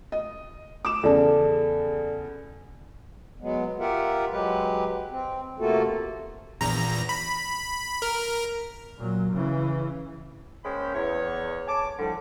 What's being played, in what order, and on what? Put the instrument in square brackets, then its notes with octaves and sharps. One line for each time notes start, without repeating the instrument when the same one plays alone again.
[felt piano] D#5
D6 E7
[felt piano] E2 C#3 [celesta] A4 D5 A5
[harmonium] F#3 G#3 B3
F4 G4 A#4 E5 F#5
F#3 G#3 G4 B4
C4
C3 A3 A#3 F4 F#4 A4
[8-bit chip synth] A#1 E2 A#5
B5
A#4
[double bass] A#2 F#3
C#3 E3
[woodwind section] G#3 A#3 C#4 C5 G5 B5
E2 C#5
C#5 G#5 A5 D6
F2 A2 D3 F3 G3